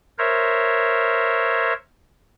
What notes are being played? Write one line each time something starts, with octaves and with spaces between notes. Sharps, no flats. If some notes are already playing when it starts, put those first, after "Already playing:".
A#4 C5 C#5 E5